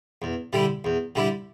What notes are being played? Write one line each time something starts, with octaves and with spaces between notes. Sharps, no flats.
E2
D3 G3 E4
E2
D3 G3 E4